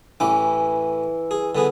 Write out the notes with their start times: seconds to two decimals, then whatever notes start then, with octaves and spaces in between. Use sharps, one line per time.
0.20 A1 E3 C#4 D6
1.31 G#4
1.55 D3 B3 G#4